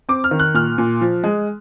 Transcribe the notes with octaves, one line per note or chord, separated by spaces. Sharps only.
C4 D6
F6
D#3
F#6
A#2 F6
A#2
F3
G#3